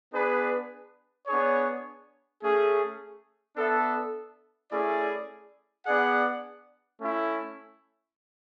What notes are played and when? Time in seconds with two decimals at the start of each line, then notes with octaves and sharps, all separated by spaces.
0.13 B3 D4 G#4 B4
1.27 B3 D4 G#4 C#5
2.41 A3 C#4 G#4
3.56 B3 D4 A4 E5
4.71 A3 C#4 E4 G#4 D5
5.85 B3 D4 G#4 D5 F#5
6.99 A3 C#4 E4